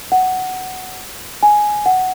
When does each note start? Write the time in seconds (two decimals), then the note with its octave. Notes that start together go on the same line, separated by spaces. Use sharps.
0.12 F#5
1.43 G#5
1.86 F#5